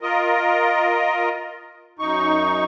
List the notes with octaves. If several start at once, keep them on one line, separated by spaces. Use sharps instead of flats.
F4 A#4 D#5
F#2 D#4 C#6